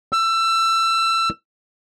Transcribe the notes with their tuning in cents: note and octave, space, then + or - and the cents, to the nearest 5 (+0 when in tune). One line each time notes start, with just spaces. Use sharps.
E6 +25